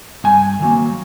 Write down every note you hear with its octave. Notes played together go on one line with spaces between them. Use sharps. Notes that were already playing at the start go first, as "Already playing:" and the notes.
G2 G#5
D#3 F#3 A#3